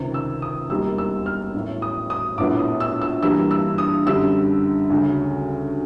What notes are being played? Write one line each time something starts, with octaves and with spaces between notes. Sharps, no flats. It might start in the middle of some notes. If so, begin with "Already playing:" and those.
Already playing: C#2 C3 D#3
E6
D#6
E1 D#2 D#3 G3 A#3 E6
E6
F6
A1 A2 F#3
D#6
D#6
A#1 A2 F#3 B3 D6
D#6
E6
E6
G2 E3 G3 A#3 E6
E6
D#6
F#2 D3 G3 E6
D2 C#3 F#3